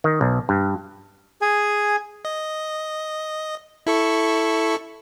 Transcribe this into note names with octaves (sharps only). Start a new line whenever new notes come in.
D#3
B1
G2
G#4 G#5
D#5
E4 A4 C#6